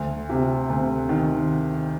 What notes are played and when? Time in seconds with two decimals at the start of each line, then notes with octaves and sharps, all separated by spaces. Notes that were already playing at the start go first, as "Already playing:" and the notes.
Already playing: D2
0.30 C3
0.70 D2
1.09 D#3